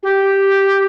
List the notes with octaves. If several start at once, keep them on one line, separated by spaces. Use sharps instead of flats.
G4